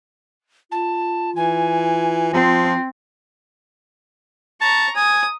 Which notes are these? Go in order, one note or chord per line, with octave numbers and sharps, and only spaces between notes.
F4 A5
E3 G#5
F3 C4
A5 A#5 C#6
G#5 D#6